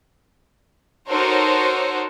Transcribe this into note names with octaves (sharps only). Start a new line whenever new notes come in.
D#4 F#4 A4 A#4 C5 C#5